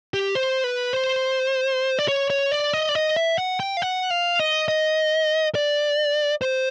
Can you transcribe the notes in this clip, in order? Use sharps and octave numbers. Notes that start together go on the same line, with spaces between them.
G4
C5
B4
C5
D5
C#5
C#5
D5
D#5
D5
D#5
E5
F#5
G5
F5
F#5
F5
D#5
D#5
D5
C5